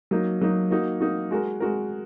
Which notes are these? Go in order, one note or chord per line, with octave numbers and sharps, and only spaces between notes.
F#3 A#3 D#4
F#3 A#3 D#4
A#3 D#4 F#4
A#3 D#4 F#4
G#3 F#4 A#4
G#3 F#4 A#4